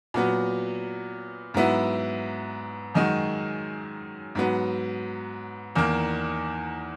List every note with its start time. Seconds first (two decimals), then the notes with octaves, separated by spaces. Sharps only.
0.14 A#2 F#3 B3
1.54 G#2 F#3 B3 E4
2.95 F#2 D#3 G#3 D#4 F#4
4.35 G#2 F#3 B3
5.75 E2 D#3 A#3